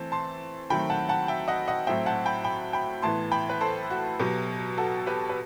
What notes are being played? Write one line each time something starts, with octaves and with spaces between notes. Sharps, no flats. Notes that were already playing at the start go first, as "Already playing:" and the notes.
Already playing: E3 A3 C4 A5
A5 C6
D#3 F#3 A3 C4 G5 B5
F#5 A5
F#5 A5
E5 G5
D#5 F#5
D#5 F#5
A2 F#3 C4 E5 G5
F#5 A5
G5 B5
G5 B5
G5 B5
A2 E3 B3 A5 C6
G5 B5
B4
A4 C5
F#4
B2 F#3 B3 G4
F#4 A4
G4 B4
B4